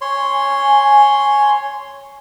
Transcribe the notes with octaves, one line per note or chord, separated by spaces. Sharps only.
C#5 G#5 C6